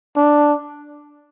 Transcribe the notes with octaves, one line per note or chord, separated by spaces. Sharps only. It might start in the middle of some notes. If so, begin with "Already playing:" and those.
D4